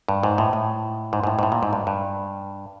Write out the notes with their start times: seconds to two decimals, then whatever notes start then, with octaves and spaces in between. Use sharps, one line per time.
0.09 G2
0.23 G#2
0.38 A2
0.53 A2
1.13 G#2
1.24 G#2
1.27 A2
1.39 G#2
1.43 A2
1.52 A#2
1.63 G#2
1.73 G2
1.87 G2